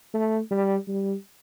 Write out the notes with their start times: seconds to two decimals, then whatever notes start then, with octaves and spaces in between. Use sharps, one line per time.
0.14 A3
0.51 G3
0.88 G3